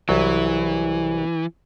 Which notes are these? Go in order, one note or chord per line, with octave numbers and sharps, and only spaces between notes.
C2 E3 F#3